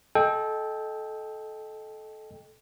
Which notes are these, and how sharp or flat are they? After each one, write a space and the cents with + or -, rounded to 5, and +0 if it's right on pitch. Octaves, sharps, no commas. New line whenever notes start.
A4 -20 D#5 +0 G5 +15